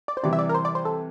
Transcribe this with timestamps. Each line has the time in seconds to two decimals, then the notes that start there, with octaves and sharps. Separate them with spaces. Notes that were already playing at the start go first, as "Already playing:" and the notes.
0.08 D5
0.17 C5
0.23 C3 E3 G3 D5
0.33 E5
0.39 D5
0.49 A#4
0.54 C5
0.65 D5
0.75 C5
0.85 A4